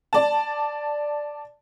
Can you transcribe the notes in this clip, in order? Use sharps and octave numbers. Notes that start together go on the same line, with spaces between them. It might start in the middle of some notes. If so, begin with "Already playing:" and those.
D5 A5